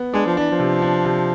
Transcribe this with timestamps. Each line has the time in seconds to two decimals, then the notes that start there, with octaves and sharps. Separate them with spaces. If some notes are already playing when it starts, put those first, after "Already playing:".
Already playing: B3
0.14 G#3 D4
0.27 F3
0.37 E3 D4
0.51 F3
0.59 C3
0.82 D4
1.05 C3